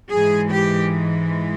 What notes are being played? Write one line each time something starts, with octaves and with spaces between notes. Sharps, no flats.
G#2 E3 G#3 G#4
G4